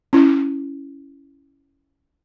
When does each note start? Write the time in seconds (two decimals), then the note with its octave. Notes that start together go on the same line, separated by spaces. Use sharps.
0.13 C#4 E4